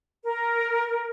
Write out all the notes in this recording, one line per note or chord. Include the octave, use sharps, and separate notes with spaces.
A#4